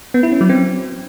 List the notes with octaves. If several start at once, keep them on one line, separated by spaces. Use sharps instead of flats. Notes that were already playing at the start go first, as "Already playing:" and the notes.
B3
E4
C#4
F#3
C4